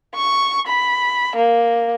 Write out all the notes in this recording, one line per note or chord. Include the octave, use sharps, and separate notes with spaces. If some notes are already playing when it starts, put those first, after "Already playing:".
C#6
B5
A#3